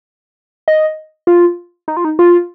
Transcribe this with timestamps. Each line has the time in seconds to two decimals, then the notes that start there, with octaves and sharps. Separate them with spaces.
0.68 D#5
1.27 F4
1.88 D#4
1.97 F4
2.05 D#4
2.19 F4